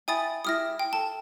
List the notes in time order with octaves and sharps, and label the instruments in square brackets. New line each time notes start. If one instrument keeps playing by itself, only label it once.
[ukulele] E4 G5 B5 [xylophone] G#5 D#6 A6
[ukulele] E4 G4 G#4 [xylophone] D#6 F6 A#6
[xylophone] G5
[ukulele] A4 [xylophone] A5